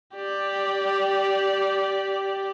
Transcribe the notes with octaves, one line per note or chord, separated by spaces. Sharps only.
G4 D5